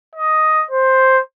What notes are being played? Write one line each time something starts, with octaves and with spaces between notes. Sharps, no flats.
D#5
C5